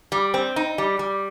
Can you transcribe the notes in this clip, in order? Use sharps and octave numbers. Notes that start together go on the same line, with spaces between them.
G3
C4
D#4
G3
G3